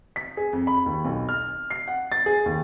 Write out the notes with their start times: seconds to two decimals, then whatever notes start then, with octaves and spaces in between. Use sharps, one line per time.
0.16 B6
0.37 G#4
0.53 F2
0.67 B5
0.86 D#2
1.05 B1
1.29 F6
1.70 C7
1.88 F#5
2.12 A6
2.26 G#4
2.46 D#2